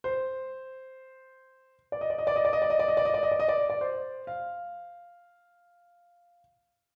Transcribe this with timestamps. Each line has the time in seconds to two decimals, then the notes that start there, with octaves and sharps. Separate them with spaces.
0.04 C5
1.92 D5
2.01 D#5
2.10 D5
2.18 D#5
2.27 D5
2.36 D#5
2.45 D5
2.53 D#5
2.62 D5
2.70 D#5
2.79 D5
2.88 D#5
2.97 D5
3.05 D#5
3.14 D5
3.23 D#5
3.32 D5
3.40 D#5
3.48 D5
3.70 D5
3.81 C5
4.27 F5